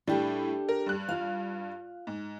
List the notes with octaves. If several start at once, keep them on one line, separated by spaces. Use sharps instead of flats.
A2 G3 D4 G4 A4
A#4
G2 F#6
F4 F5
G#2